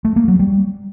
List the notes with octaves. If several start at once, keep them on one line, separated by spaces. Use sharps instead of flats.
A3
A#3
F#3
G3